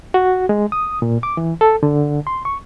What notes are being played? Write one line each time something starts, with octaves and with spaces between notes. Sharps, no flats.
F#4
G#3
D#6
A#2
D6
E3
A4
D3
C6
C#6